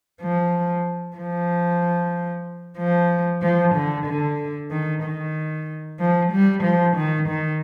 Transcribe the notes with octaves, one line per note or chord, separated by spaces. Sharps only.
F3
F3
F3
F3
D3
D3
D#3
D#3
F3
G3
F3
D#3
D#3